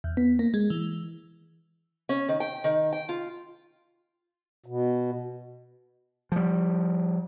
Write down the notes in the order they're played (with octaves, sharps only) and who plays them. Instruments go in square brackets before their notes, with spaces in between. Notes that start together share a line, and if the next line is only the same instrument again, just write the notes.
[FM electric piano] E2
B3
A#3
G#3
E3
[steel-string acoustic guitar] C#4
D#3
G5
D#3
G5
F4
[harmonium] B2
[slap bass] F3 G3